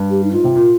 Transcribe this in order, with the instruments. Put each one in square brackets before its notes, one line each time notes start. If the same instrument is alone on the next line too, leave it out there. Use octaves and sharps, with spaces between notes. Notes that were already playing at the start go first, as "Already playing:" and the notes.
Already playing: [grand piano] G2
[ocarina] G4
D#4
[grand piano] G#2 [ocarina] F4
[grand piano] C3
A#2